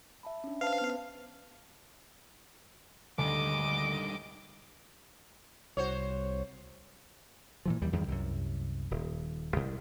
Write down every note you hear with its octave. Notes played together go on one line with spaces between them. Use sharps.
E5 A5 B5
C#4 D4
B4 C5 F5 A5
B3 C#4
D2 G2 D#3 D#5 D6
C2 F#4 C5 C#5
A#2 E3 F3
D#2 E3 G3
E2 G2 D#3 G3
C2 F#2
D#1
C2